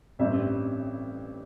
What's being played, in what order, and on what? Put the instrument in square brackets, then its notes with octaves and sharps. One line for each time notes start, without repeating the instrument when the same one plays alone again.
[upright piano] A1 G2 G3 C4 E5